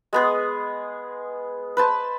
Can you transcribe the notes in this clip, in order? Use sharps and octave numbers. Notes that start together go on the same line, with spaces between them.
G#3 B3 G#4
B4 C5 A5